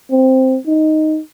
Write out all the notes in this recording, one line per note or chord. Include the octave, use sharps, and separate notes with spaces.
C4
D#4